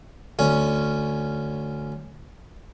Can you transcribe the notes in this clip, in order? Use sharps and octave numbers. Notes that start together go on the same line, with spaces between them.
D2 C#4